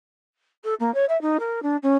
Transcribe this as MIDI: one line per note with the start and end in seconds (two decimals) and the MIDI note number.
0.64 0.74 69
0.80 0.93 58
0.94 1.05 73
1.09 1.19 76
1.21 1.37 63
1.39 1.62 70
1.62 1.77 62
1.82 1.96 61